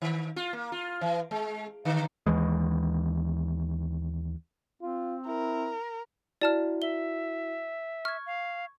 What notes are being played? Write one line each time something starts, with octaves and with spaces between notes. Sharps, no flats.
D#3
F4
A#3
F4
E3
G#3
D3
D#2 E3 G#3
C4 F4
E4 A#4
E4 F#4 D5 A5 F6
E5 G7
C#6 F6 G#6
F5